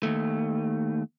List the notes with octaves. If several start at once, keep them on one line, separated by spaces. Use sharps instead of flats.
D#2 A3